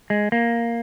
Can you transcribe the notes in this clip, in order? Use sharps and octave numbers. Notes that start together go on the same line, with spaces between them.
G#3
A#3